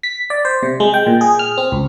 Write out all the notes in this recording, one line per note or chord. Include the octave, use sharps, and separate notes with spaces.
B6
D5
C5
C3
G#3
G5
A#2
G#4
F6
C4
C#2